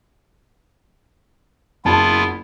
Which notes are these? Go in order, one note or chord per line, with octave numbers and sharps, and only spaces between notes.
F#1 B3 E4 F4 A5 B5